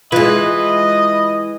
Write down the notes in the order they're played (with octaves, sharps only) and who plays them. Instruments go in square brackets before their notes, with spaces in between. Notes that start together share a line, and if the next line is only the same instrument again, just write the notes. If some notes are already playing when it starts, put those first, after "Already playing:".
[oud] E3 G#3 [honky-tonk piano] F4 [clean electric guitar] B4 [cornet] D#5